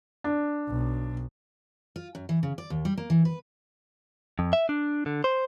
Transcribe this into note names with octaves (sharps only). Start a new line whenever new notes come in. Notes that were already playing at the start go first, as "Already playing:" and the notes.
D4
B1
F4
F#2
E3
C#3
D5
D#2
G3
A#3
E3
B4
F2
E5
D4
D3
C5